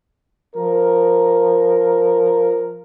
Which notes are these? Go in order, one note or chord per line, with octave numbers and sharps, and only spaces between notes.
F3 A#4